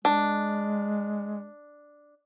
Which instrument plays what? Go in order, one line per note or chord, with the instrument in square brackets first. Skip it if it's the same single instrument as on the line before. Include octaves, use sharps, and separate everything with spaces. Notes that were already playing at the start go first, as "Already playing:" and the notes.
[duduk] G#3 [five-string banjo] D4